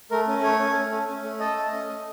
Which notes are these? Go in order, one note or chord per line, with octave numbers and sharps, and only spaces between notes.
A3 A#4
C#4
A3 C#5
C#4
A3
C#4
C#4
A3
A4 D#5
A3
C#4
A3